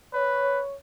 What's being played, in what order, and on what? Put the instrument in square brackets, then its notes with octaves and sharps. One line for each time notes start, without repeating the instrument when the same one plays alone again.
[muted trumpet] B4 [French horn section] C#5